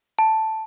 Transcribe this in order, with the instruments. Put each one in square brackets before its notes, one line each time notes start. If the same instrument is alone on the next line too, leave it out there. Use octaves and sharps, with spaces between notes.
[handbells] A5